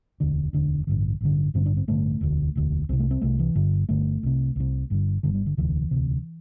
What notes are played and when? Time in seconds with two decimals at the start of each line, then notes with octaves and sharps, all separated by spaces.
0.20 E1 D2 D3 D4
0.53 E1 D2 D3
0.87 A1 G2 D3
1.21 A1 G2 D3
1.54 A1 G2 D3 C4
1.66 D4
1.77 C4
1.88 A1 G2 D3 A3
2.21 E1 D2 D3
2.55 E1 D2 D3
2.89 C2 C3 C4
2.99 A3
3.11 C4
3.21 C2 C3 A3
3.39 E3
3.55 G1 G2 D3 G3
3.89 G1 G2 D3 A3
4.23 C2 C3
4.56 C2 C3
4.90 G1 G2 D3
5.23 G1 G2 D3
5.34 G3
5.46 D3
5.57 E1 D2 C3 E3
5.91 E1 D2 C3